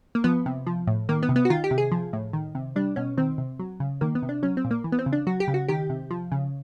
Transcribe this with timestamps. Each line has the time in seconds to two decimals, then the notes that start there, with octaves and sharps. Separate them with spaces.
0.15 A#3
0.24 F3 B3
0.46 C3
0.67 F3
0.87 A2
1.09 D#3 A#3
1.23 B3
1.29 C3
1.36 B3
1.45 F#4
1.50 D#3 F4
1.64 G4
1.71 C3
1.78 G#4
1.92 F3
2.13 A2
2.33 D#3
2.55 C3
2.76 G3 D4
2.96 B2 C#4
3.17 D#3 C4
3.38 C3
3.59 F#3
3.80 C#3
4.01 D#3 A#3
4.15 B3
4.23 C3
4.29 D4
4.43 F#3 C#4
4.57 C4
4.65 A#2
4.71 A#3
4.84 E3
4.92 B3
4.99 C4
5.06 C#3
5.13 D4
5.27 F#3 F#4
5.40 G4
5.48 C#3
5.54 F#4
5.69 D#3 G4
5.90 C3
6.11 F3
6.32 C#3